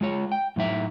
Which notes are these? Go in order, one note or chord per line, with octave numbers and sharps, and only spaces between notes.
G#3 F4 C#5
G5
A2 F#3 D#4 E5